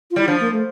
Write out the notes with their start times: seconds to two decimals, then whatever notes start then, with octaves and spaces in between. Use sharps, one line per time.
0.11 F4
0.16 G3 E4
0.27 F3 D4
0.40 A#3
0.52 A3